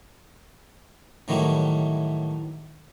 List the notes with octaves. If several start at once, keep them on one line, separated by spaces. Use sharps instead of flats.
A2 D#3 E3 F#3 G3